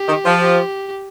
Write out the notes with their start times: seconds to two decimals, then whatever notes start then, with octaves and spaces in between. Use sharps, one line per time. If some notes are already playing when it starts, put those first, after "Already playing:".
Already playing: G4
0.08 D#3
0.25 F3
0.41 G4